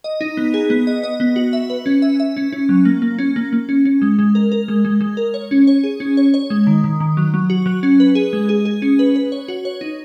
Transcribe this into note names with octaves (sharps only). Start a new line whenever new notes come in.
D#5
D#4
B3
G#4
B3
D#5
D#5
B3
F#4
E5
B4
C#4
E5
E5
C#4
C#4
F#3
A#3
A#3
C#4
A#3
A#3
C#4
C#4
G#3
G#3
A#4
A#4
G#3
G#3
G#3
A#4
C#5
C#4
C#5
G#4
C#4
C#5
C#5
G#3
D#3
D#3
D#3
F#3
F#3
F#4
F#3
C#4
B4
G#4
G#3
G#4
G#4
C#4
B4
B4
C#5
F#4
C#5
D#4